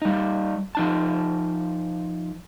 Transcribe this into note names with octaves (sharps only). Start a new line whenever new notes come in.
G3 D#4
F3 D#4 A5